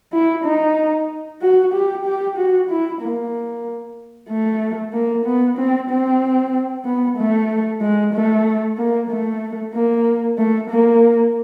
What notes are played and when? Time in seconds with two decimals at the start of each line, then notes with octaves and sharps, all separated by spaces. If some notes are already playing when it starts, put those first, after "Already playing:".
0.13 E4
0.45 D#4
1.42 F#4
1.73 G4
2.05 G4
2.37 F#4
2.70 E4
3.01 A#3
4.29 A3
4.93 A#3
5.26 B3
5.58 C4
5.90 C4
6.85 B3
7.17 A3
7.81 G#3
8.13 A3
8.78 A#3
9.10 A3
9.74 A#3
10.38 A3
10.70 A#3